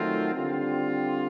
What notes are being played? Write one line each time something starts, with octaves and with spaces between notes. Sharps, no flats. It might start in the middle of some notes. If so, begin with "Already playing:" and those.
Already playing: D#3 F#3 A3 C4 F4
D3 G3 C4 F4